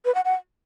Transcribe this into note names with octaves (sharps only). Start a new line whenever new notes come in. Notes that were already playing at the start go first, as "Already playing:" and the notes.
B4
F#5
F#5